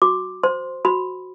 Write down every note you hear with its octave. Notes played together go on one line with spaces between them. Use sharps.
F#4 D6
C5 C6
F#4 B5